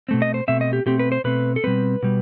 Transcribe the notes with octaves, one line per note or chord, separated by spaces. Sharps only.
B2 A3 C4
D#5
C5
B2 A3 C4 E5
D#5
G4
B2 A3 C4 G4
B4
C5
B2 A3 C4 B4
A4
B2 G3 C4 B4
B2 G3